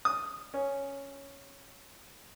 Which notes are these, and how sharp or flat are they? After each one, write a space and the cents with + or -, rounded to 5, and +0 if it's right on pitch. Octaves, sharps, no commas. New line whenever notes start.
D#6 +0
C#4 +0